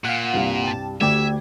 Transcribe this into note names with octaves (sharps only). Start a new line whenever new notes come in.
A#2 F5 F#5
C2 G2 G3
G4 A5
D2 G4 D5 E5 G#6